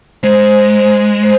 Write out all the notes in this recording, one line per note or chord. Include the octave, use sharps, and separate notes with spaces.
G#3 C5
C5